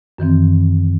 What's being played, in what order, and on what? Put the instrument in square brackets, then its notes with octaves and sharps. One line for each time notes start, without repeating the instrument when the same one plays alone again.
[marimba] F#2 D#3 E3 C4